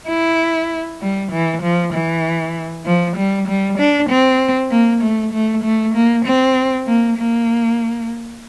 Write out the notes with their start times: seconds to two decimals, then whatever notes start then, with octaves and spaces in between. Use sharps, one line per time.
0.09 E4
1.01 G3
1.32 E3
1.62 F3
1.93 E3
2.86 F3
3.17 G3
3.48 G3
3.79 D4
4.09 C4
4.71 A#3
5.02 A3
5.33 A3
5.64 A3
5.94 A#3
6.26 C4
6.87 A#3
7.17 A#3